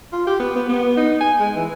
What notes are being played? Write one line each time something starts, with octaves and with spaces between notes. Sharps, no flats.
F4
G4
B3
B3
B3
D#4
G#5
G#3
E3